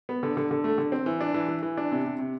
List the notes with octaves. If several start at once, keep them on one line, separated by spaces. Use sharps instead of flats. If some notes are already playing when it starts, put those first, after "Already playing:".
B3
D3
D3
D3
A3
D3
C4
E3
D4
E3
E3
E3
D4
C3
C3
C3